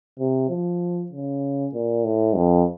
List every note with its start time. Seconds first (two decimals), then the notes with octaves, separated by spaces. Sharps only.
0.19 C3
0.50 F3
1.12 C#3
1.74 A#2
2.05 A2
2.36 F2